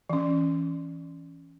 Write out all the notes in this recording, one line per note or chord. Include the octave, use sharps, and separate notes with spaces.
E3 C#4